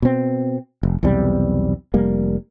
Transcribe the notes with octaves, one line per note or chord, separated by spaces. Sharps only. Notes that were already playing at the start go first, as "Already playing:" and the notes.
B2 C4
F1
B1 E2 C3 G3
F1 G3 A#3